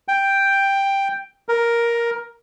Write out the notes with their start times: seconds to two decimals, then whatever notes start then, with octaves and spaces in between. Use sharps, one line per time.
0.08 G5
1.49 A#4